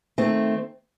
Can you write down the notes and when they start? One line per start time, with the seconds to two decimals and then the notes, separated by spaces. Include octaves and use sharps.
0.18 D#3 A3 C4